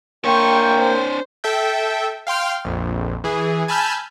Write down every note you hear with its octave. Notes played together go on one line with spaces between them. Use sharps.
A#3 D4 C#5 G5 C6 C#6
C5
A4 E5 G5
F5 G5 C6 F6
A#1 F2
E3 G#4
G#5 A5 B5 E6 F6 G6